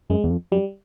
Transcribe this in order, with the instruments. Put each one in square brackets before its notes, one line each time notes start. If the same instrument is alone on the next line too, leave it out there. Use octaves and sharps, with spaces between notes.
[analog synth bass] F#2 [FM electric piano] G#3
[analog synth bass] E2
F2
[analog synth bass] F#2 [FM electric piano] G3